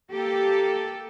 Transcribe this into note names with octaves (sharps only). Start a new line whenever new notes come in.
A#3 G4 A4